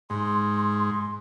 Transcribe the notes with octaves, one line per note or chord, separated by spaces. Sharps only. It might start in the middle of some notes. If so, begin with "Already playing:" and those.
G#2 C6